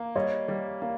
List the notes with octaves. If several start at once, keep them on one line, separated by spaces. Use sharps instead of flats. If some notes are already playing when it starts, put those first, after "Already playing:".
Already playing: A#3
G3 C#5 D#5
G3
A#3